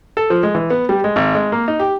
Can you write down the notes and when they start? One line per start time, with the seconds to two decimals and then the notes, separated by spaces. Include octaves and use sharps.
0.17 A4
0.30 F3
0.43 G#3
0.55 E3
0.70 B3
0.89 G3
1.04 G#3
1.16 G#1
1.35 G#3
1.52 A#3
1.68 D#4
1.80 G4